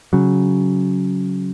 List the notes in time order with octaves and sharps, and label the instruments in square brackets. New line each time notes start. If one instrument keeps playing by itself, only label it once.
[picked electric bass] C#3 F#3